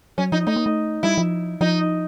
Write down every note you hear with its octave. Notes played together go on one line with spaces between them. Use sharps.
F#3 C#4
F3 D#4
A3 D#4
A#3
A3
G3 E4
F3
F3 D#4